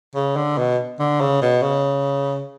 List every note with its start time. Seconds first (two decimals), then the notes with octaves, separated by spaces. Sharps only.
0.15 C#3
0.36 D3
0.58 B2
0.99 D3
1.20 C#3
1.42 B2
1.62 C#3